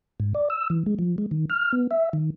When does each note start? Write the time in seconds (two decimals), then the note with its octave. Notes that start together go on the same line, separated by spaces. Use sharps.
0.20 G#2
0.35 D5
0.50 E6
0.70 E3
0.86 G#3
0.99 F3
1.18 G#3
1.31 D#3
1.50 F6
1.73 B3
1.91 E5
2.13 D#3